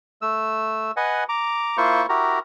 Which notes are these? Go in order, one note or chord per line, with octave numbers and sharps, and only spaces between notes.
A3 E6
B4 D#5 F#5 G#5
A#5 D6
A#3 E4 F4 C5 C#6
E4 F#4 G4 A#4 A#5